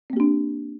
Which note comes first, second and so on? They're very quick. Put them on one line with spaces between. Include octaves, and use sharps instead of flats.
C4 A#3 G4 D4